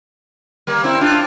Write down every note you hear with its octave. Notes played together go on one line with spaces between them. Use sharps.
G3 A#3
C4 E4
D4 F4